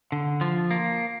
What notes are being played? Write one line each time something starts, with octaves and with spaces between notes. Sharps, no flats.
D3
F3
A#3